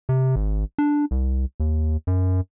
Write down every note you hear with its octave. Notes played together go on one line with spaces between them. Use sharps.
C3
G#1
D4
C2
D#2
F#2